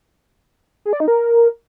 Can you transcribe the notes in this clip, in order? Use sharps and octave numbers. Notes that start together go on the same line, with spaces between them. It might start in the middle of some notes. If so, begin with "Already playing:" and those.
G#4
D5
D#4
A#4